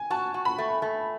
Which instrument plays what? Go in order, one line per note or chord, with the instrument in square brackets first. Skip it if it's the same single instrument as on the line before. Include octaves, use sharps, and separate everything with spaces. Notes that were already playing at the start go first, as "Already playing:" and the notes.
Already playing: [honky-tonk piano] G#5
[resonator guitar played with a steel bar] F#4 [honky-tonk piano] A5
[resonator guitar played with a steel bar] F#4
[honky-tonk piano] B5
[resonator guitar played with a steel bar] A3
A3